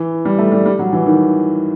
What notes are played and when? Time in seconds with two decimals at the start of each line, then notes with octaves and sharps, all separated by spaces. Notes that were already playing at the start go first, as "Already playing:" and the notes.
Already playing: E3
0.25 G3
0.38 A3
0.52 G3
0.66 G3
0.79 F#3
0.93 E3
1.06 D#3